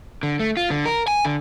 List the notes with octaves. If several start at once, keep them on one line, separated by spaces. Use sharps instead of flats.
D3
A3
F4
D3
A#4
G#5
D3